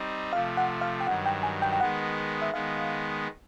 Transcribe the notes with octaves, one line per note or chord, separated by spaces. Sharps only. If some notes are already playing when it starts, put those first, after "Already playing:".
Already playing: G3 C4 D#4
C3 F3 A3 F5
F#5
F5
G5
G2 D#3 F#3 F#5
G5
G#5
G5
G5
D#3 G#3 B3 F#5
E5
D#3 G#3 B3 F5